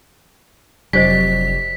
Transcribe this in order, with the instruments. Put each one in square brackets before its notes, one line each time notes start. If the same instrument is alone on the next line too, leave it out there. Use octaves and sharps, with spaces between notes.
[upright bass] F1 [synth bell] F#3 G4 D5 [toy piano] D4 C5 D#5 [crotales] B6